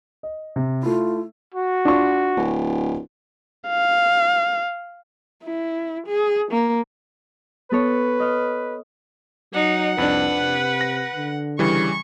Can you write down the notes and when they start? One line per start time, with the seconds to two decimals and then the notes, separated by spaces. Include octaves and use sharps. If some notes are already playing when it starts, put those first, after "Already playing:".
0.23 D#5
0.56 C3
0.83 A3 E4 F4
1.54 F#4
1.85 D4 F4 C#6
2.37 D1
3.68 F5
5.44 E4
6.07 G#4
6.51 A#3
7.71 B3 A4 B4 C#5
8.20 D#5 F6
9.53 F#3 D#4 F#5
9.98 C2 F2 D4 B4
10.39 C3
10.81 A#6
11.15 D3
11.59 C#3 E3 G3 C#6